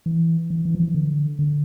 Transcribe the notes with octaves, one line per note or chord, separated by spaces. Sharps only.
E3
E3
E3
F3
E3
D3
D3